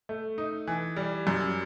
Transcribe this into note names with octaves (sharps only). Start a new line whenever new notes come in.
A3
D#4
E3
G3
F#2